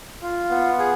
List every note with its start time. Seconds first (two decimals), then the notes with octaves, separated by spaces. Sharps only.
0.22 F4
0.50 B3
0.79 G#4